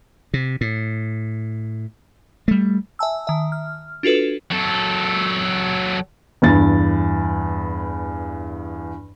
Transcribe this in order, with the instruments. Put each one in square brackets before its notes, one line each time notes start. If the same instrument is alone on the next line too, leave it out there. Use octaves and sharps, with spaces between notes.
[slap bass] C3
A2
G3 A3
[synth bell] E5 G#5 A5 E6
D#3 E5
F6
D4 F4 F#4 A4 B4
[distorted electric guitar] F#3 A4
[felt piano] E2 G2 A6